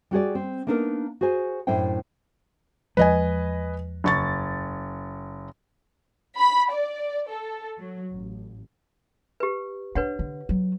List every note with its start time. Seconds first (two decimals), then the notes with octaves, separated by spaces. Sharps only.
0.11 G3 F#4 G#4 D5
0.35 C4
0.67 A#3 B3 D4 D#4 G#4 A#4
1.21 F#4 G#4 C5 G#5
1.67 F#2 A2 D4 E4 C5 G5
2.97 E2 F3 G#3 B4 D#5 G#5
4.04 F#1 C#6 A6
6.37 B5
6.71 D5
7.29 A4
7.78 F#3
8.12 A1
9.40 G4 B4
9.95 D4 B4 C#5 F#5
10.19 D3
10.49 F#3